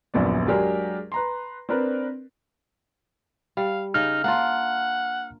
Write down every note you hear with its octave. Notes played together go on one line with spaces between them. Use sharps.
D#1 A#1 F#2 B3 D5
F#3 G#3 D4 G4 G#4 A#4
B4 A#5 C6
C4 D4 A#4 B4 D5
G3 F5
C#3 D#4 F6
A#3 D4 F4 F#5